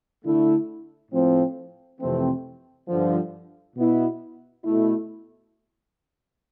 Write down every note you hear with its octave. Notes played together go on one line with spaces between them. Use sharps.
D3 A3 E4
A2 F3 C4
F2 C3 E3 A3 C4
G2 D3 F3
B2 B3 E4
B2 A3 E4